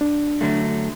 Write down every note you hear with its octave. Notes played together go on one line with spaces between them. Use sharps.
D4
D3 F#3 A3